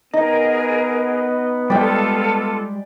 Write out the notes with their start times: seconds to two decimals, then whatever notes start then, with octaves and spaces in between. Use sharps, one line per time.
0.13 B3 D#4 G#4 A#4 D#5
1.70 G3 G#3 F4 G4 A4 D5 G5